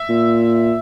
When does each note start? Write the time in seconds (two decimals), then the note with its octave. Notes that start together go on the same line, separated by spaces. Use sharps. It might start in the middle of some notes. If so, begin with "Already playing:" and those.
Already playing: E5
0.09 A#2